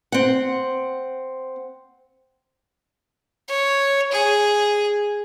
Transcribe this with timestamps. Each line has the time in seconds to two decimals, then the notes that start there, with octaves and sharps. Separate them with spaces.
0.12 C4 F#5
3.48 C#5
4.12 G#4